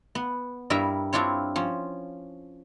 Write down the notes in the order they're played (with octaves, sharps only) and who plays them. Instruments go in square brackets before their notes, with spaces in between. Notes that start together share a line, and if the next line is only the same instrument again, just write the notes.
[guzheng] B3
G2 G3 E4 A#4 E5
C4 D4 E4 F4 C#5
F3 C#4